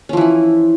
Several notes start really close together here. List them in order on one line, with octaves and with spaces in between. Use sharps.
C#4 F3 E3 E4